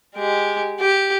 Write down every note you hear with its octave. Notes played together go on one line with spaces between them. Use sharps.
G#3 G4
G4